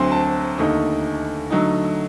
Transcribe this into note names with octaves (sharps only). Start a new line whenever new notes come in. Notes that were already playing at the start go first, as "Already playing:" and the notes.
Already playing: D2 D3 F#3 C4 C6
A5
D#2 D3 A3 D#4
D3 F#3 A3 D#4